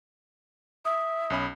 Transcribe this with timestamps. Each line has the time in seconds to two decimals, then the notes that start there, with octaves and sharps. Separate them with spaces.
0.85 E5 D#6
1.30 B1 C#4 B5